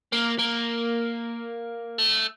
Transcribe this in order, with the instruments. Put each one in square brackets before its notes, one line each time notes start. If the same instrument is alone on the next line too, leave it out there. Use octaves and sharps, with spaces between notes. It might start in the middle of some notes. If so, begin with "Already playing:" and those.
[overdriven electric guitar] A#3
A#3
A3